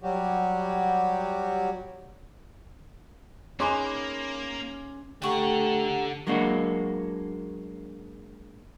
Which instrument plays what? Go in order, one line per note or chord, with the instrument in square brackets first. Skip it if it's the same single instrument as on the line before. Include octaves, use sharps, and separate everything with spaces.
[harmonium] F#3 G3 F#4 G4
[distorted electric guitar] A#3 [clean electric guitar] C#4 [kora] D#4 G#4 B4 [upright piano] G#5 C6 D6
[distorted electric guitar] D3 F#5 [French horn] A3 [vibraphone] G4 A#5 [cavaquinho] G5 C#6
[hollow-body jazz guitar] F#3 G#3 A#3 D4 F#4